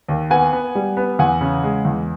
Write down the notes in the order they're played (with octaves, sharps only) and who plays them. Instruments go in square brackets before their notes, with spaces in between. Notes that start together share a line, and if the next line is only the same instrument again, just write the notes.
[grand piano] D#2
B3 F#5 G#5
B3
G3
B3
E2 F#5 G#5
C#3
G#3
E2